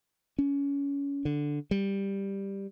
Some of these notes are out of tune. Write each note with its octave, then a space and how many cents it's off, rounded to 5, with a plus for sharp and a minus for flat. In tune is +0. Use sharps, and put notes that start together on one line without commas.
C#4 +25
D3 +0
G3 +5